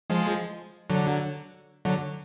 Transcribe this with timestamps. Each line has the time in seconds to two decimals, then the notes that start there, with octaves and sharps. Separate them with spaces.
0.10 F3 G#3
0.90 D3 F#3
1.85 D3 F#3